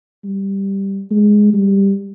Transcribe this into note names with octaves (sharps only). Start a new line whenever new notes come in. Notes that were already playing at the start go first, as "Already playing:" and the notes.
G3
G#3
G3